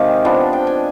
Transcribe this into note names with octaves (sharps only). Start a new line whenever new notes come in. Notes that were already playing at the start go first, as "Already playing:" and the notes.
Already playing: C3 D#3 G#3 G4 F5
F3 B3 D4
G5
G#5